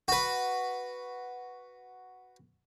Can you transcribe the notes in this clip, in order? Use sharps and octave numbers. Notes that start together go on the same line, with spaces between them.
F#4 B4